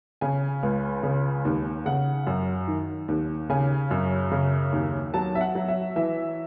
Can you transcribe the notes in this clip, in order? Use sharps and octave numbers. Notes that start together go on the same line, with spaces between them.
C#3 G#5
C#2
C#3
D#2
C#3 F#5
F#2
D#3
D#2
C#3 G#5
F#2
C#3
D#2
F#3 A5
E5
F#5
F#3
E5
E3 E5